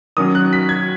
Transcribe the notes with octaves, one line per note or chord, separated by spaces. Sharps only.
D#3 F#3 C#4 D#6
F#6
B6
G#6